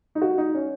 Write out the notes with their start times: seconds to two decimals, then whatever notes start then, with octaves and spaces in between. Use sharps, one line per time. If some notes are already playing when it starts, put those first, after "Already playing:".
0.15 D#4
0.22 F#4
0.38 D#4
0.55 C#4